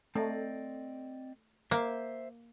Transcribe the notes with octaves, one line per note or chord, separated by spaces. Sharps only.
A3 C4 D5 D#5
A#3 C5 E5